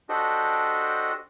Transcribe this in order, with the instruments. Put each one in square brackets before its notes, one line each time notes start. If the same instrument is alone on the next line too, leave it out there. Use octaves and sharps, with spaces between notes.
[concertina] D4 F#4 G4 A4 C5 D#5